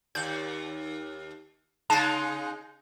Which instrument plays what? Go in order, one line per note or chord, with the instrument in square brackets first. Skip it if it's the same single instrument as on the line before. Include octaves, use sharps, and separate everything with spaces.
[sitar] D#2 D5 [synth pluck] G6
[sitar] C#3 G#3 D#4 [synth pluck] A5 A6